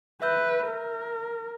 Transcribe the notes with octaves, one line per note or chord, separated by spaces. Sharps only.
B4 E5 E6 G6
A#4